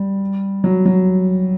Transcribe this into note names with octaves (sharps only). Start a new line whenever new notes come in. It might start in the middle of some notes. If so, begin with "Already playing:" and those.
Already playing: G3
F#3
F#3